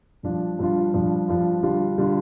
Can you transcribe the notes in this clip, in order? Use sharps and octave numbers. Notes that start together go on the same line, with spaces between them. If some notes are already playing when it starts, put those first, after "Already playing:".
G2 F3 D4 F4
G2 F3 D4 F4
G2 F3 D4 F4
G2 F3 D4 F4
D3 G3 D4 F4
D3 G3 D4 F4